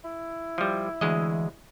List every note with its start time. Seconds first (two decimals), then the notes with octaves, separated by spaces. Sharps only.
0.04 E4
0.58 F3 G3
1.01 D2 E3 G#3 D#5